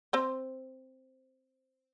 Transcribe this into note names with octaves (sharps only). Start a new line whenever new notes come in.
C4 C5